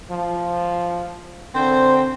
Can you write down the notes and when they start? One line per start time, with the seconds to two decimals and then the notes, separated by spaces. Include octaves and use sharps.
0.10 F3
1.55 D3 C4 C5